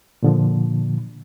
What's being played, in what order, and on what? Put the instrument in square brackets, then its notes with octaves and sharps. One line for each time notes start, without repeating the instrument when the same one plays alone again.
[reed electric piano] A#2 D3 F3